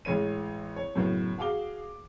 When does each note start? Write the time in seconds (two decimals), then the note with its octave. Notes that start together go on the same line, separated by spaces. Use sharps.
0.05 A1 G#3 C#5 D#7
0.76 C#5
0.95 F#2 A2 C#3 B3
1.38 F#4 G#4 F5 D6 G7